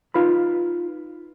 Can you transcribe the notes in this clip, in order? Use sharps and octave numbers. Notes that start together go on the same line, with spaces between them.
D#4 F4 B4 B5